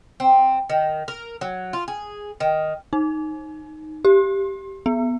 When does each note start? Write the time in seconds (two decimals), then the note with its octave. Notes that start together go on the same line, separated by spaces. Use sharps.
0.20 C4
0.69 D#3
1.08 A#4
1.41 F#3
1.73 F4
1.88 G#4
2.40 D#3
2.93 D#4
4.05 G4
4.86 B3